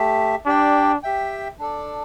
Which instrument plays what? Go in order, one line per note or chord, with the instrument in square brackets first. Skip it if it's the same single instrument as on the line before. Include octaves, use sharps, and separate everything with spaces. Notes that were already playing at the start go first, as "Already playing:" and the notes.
Already playing: [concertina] A3 G4 E5
[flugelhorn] D4 [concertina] G4 D5 G5
[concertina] G4 E5 G5
D4 A4 D5